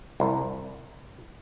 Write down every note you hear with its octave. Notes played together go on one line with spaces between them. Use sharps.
C2